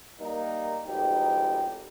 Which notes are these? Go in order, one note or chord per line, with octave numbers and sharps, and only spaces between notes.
G3 A#3 D#4
G#1 F2 A2 B3 D#4 G4